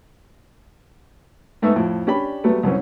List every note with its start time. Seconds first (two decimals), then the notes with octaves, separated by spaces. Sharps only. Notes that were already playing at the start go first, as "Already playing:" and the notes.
1.62 G#2 A3 B3 D#4 E5
1.76 F2 A2
2.07 C#4 D4 G4 D5 B5
2.44 F#3 G3 A3 B3
2.63 C2 F#2 C4 C#4